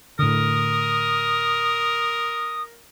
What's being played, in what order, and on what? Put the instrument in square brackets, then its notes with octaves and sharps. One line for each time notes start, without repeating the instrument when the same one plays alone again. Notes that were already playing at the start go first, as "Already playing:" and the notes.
[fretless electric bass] A2 D3 [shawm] A#4 [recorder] D#6